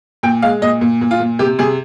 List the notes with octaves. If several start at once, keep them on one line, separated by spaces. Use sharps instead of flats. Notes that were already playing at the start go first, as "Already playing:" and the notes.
A#2 G5
G#3 F5
A#2 D#5
A#2
A#2
F4
A#2
C3 G4
C3 G#4